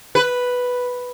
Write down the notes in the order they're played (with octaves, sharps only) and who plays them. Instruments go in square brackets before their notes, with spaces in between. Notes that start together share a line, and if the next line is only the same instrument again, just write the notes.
[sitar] B4